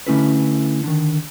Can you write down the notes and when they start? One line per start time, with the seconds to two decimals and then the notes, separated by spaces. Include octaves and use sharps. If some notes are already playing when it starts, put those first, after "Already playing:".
0.07 D3 A3 C#4 E4 A4 B4
0.84 D3 D#3